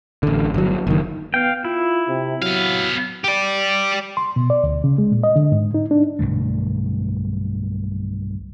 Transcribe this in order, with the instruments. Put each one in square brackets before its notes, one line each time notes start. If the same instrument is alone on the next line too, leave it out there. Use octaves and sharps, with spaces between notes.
[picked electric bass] A1 D3
G1 F#3
F#1 D#3
[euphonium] B3 [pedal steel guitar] F5 G5
[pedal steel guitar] E4 [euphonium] F4
[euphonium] C3
[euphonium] F#3 [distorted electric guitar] B3 F5
[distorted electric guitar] G4 D5
[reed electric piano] C6
B2
D5
D2
C#3
G#3
A#2
D#5
D3
G#2
D#4
D4
[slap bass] B1 G2 D3 A3